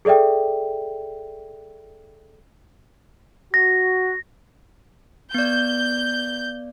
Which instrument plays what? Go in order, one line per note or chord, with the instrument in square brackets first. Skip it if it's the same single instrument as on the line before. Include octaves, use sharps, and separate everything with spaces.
[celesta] G#4 A4 D5 E5 G5
[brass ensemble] F#4 [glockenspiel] A#6
[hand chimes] B3 D5 [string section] G6